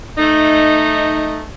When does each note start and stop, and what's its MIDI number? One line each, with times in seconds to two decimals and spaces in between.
0.17 1.43 57
0.17 1.43 63